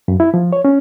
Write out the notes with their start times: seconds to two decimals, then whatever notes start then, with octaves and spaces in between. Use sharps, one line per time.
0.08 F#2
0.20 E4
0.34 F3
0.53 C#5
0.65 C#4